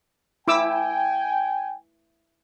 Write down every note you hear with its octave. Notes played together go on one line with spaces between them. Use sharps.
E4 G5 G#5 D6 E6